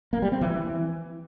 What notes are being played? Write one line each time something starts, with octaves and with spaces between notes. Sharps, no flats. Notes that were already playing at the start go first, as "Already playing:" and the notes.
A#3
G3
C4
E3